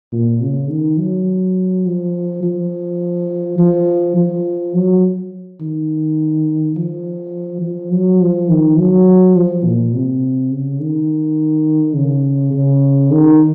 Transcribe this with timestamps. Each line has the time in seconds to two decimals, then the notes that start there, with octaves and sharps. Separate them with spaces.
0.12 A#2
0.41 C#3
0.70 D#3
0.98 F#3
1.86 F3
2.43 F3
3.58 F3
4.16 F3
4.74 F#3
5.61 D#3
6.76 F3
7.62 F3
7.91 F#3
8.21 F3
8.49 D#3
8.78 F#3
9.35 F3
9.65 A#2
9.94 C3
10.51 C#3
10.80 D#3
11.95 C#3
12.53 C#3
13.11 D#3